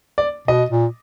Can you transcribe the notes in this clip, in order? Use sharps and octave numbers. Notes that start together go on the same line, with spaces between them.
D5
B2 D#5
A#2